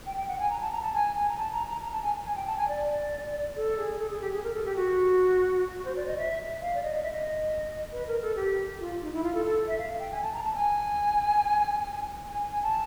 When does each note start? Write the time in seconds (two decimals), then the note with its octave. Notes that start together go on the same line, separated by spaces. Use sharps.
0.06 G5
0.17 G5
0.28 F#5
0.39 G#5
0.50 A#5
0.61 A5
0.72 A#5
0.83 A5
0.94 G#5
1.15 G#5
1.29 A#5
1.37 A5
1.52 A#5
1.67 A#5
1.81 A#5
1.92 A5
2.03 G#5
2.25 G#5
2.36 G5
2.46 A5
2.57 G#5
2.68 D5
3.56 A4
3.78 G#4
4.00 A4
4.11 G#4
4.21 G4
4.32 G#4
4.44 A#4
4.54 A4
4.65 G4
4.76 F#4
5.74 F#4
5.85 C5
5.96 D5
6.07 D#5
6.18 E5
6.62 F5
6.75 D5
6.83 D#5
6.95 D#5
7.03 E5
7.12 D#5
7.92 B4
8.07 A#4
8.22 A4
8.36 G4
8.80 F4
9.02 D#4
9.13 E4
9.24 F4
9.34 A4
9.45 A4
9.68 E5
9.79 F5
10.00 G5
10.11 G#5
10.22 A5
10.33 A#5
10.44 A5
10.55 G#5
12.29 G#5
12.51 G#5
12.63 A5